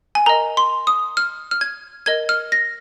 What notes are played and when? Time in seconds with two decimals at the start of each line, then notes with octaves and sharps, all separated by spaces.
0.15 G#5
0.26 A#4 D#5 A#5
0.57 C6
0.87 D#6
1.17 F6
1.51 F6
1.61 G#6
2.06 A#4 D#5 G#6
2.29 F6
2.52 A#6